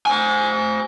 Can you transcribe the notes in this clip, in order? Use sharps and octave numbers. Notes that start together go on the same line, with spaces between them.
C5 G#5